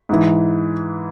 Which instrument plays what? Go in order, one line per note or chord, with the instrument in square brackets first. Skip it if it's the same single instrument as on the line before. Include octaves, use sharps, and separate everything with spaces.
[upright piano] G#2 E3